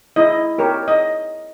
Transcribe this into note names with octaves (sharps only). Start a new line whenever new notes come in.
E4 D#5
G4 A#4 C#5
D#5